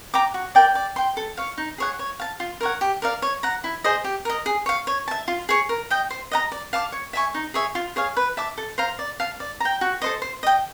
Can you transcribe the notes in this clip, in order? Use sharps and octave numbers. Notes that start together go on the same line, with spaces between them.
G5 A#5 D6
F#4
A#4 D5 G5
D5
G5 C6
A4
C#5 F5
D#4
G#4 C#5 F#5
C#5
F5 A5
F4
A#4 C#5 F#5
G4
A#4 D5 F5
C#5
F#5 A#5
E4
G#4 C5 D#5
G4
A#4 D#5
G#4
C#5 F5
C#5
E5 A5
F4
G#4 C#5
A#4
D#5 G5
C5
D#5 F#5 A#5
D5
F5 A5 D6
C#5
E5 G#5 C#6
D#4
G#4 C#5 E5
F4
G#4 C#5 F5
B4
E5 A5 D6
A4
C5 F5 A#5
D5
F5 A5
D5
G5 A#5
F#4
A4 C5 D#5
C5
D#5 G5